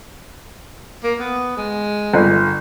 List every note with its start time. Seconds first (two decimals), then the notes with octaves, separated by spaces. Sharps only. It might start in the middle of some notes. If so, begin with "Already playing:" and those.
1.04 A#3
1.19 B3
1.57 G#3
2.14 G1